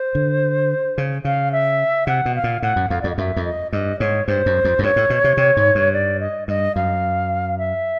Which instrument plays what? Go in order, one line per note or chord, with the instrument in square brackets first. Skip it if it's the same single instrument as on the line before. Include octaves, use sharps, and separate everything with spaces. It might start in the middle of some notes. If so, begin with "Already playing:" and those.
Already playing: [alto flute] C5
[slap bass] D3
C#3
[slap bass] C#3 [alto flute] F5
[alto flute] E5
[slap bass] C3 [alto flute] F#5
[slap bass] B2
[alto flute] F5
[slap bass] A#2
[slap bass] A2 [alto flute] F#5
[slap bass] F#2
[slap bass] F2 [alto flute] F5
[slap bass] F2 [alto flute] D5
[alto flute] D#5
[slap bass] F#2 [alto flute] E5
[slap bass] F2
[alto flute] D#5
[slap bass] G2 [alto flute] D#5
[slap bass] G#2 [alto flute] C#5
[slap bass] G2 [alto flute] C5
[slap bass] F#2
F2
F#2
[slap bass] G2 [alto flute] C#5
[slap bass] A2
B2
C3
C3
G#2
G2
[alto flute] D5
D#5
[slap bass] G2 [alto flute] D#5
[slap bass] F#2 [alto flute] F5
[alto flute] E5